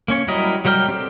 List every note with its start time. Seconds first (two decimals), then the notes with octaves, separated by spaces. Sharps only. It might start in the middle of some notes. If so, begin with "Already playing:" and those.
0.08 A#3 C#4 C#5
0.28 F#3 G3 E4 A#4 D#5
0.65 F#3 G3 A#4 G5 F6
0.88 C4 G4 A4